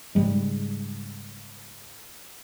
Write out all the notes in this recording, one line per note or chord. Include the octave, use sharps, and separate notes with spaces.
G#2 C#3 G3 G#3